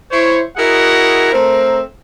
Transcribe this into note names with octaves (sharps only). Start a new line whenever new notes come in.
E4 C5 C#5
E4 F#4 G#4 A#4 D#5 F#5
A3 C4 A#4